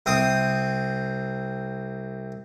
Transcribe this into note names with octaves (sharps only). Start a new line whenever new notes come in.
C2 C4 D#6